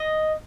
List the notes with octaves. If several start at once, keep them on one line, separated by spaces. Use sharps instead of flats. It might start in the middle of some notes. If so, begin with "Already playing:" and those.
Already playing: D#5